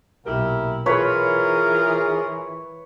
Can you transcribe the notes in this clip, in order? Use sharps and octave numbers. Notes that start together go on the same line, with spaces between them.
B1 A#2 E4 G4 A#4
E3 F4 G#4 A#4 B4 C#5 B5